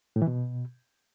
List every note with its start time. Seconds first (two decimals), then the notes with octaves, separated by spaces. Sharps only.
0.16 A2
0.22 E3
0.27 B2